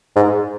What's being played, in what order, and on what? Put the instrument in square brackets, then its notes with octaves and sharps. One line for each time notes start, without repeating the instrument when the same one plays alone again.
[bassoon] G#2